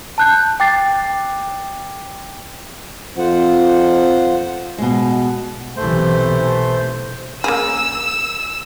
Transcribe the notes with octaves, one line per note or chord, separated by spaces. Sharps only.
A5 F#6 G6
G5 D6 A6 C7
F2 F4 C5 F#5
B2 G#3
B1 C3 E3 A3 C5
A#3 C#4 G#4 E6